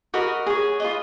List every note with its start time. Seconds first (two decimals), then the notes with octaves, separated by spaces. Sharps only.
0.14 F#4 A#4 D#5 B5
0.46 G#4 C#5
0.80 F4 B4 D#5